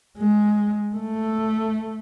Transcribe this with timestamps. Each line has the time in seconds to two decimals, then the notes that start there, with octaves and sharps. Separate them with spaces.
0.17 G#3
0.96 A3